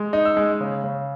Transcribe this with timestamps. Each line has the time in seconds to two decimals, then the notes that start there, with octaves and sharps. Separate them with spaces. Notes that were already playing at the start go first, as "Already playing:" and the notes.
Already playing: G#3
0.13 D#4
0.25 E6
0.37 G#3
0.61 C#3
0.84 C#3